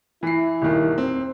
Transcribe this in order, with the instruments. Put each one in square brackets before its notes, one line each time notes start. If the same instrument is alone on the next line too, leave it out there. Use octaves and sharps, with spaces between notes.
[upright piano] E3 C7 [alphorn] E4
[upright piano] D#1 D#3
C4